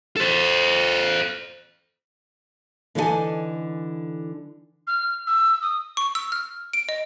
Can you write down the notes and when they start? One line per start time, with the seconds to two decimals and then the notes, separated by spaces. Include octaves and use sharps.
0.17 A4 C5
2.95 D3 E3 D#4 E4 A4 G#5
4.87 F6
5.27 E6
5.62 D#6
5.97 C#6
6.15 E6
6.32 F6
6.73 D7
6.89 D#5